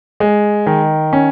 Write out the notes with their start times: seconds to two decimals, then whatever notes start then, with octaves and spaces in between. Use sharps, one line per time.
0.20 G#3
0.66 D#3
1.13 C#4